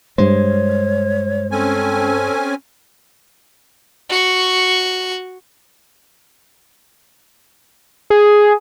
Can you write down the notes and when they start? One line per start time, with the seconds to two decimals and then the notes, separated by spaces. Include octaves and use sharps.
0.18 G2 G#3 C5 C#5
1.51 C4 C#4 A4 G#5
4.09 F#4 C#6
8.10 G#4